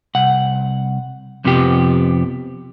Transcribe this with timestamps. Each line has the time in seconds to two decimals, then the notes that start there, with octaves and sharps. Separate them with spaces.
0.15 C2 F#5
1.44 F2 C3 F3 B3 G4